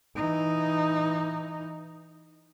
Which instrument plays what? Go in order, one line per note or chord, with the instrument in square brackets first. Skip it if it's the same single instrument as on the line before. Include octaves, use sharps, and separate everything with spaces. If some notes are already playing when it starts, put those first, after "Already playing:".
[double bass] E3 D#4